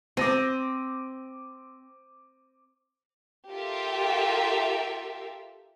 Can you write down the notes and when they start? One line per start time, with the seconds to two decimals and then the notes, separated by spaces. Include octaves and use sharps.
0.17 C4 D6 A#6 D#7
3.51 F4 G4 A4 A#4 E5